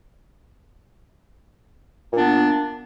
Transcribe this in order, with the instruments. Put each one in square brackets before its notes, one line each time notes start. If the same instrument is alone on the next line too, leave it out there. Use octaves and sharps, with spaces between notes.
[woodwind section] A#2
D4
B3